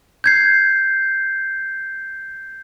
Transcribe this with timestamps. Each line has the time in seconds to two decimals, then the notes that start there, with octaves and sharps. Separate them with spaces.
0.24 G6 G#6 C7